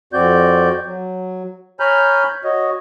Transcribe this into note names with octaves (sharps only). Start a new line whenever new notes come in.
F2 C4 F#4 D5 G6
F#3
C#5 G#5 A#5 B5 F6 G6
F#4 C#5 D#5